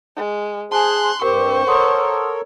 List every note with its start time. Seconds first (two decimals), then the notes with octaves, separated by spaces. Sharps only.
0.16 G#3
0.71 G#4 C5 G#5 A5 C6 F#6
1.22 G2 C4 G4 A#4 C5 C#6
1.67 A4 A#4 C#5 F#5 C6 D#6